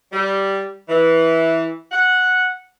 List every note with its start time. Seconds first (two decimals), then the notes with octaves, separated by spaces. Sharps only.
0.12 G3
0.88 E3
1.91 F#5